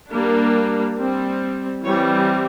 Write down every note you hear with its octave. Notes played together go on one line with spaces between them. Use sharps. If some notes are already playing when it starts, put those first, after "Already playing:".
G3 A#3 D4
G3 C4
E3 G3 C4 C#5